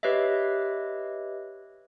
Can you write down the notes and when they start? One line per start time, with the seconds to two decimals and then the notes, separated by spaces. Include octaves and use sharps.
0.03 G4 B4 C#5 D#5 E5